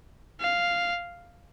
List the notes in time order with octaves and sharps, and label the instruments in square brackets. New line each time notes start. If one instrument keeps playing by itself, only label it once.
[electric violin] F5